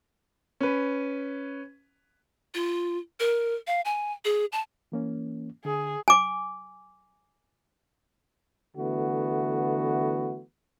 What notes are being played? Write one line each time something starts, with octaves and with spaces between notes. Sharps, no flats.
C#4 B4
F4
A#4
F5
G#5
G#4
A5
E3 A#3 C#4
D3 G#4
G#5 D6
D3 E3 A3 B3 F#4